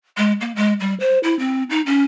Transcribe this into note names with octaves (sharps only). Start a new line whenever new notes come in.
G#3
A#3
G#3
G3
C5
E4
C4
D#4
C#4